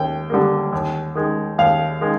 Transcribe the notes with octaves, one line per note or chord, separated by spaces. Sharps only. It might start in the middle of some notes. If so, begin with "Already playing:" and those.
Already playing: D#2 G5
D3 G3 A#3
D#2
D#3 G#3
D#2 F5
D#3 G#3